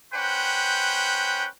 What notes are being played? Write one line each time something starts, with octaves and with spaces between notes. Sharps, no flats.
C#4 B4 C5 F#5 G5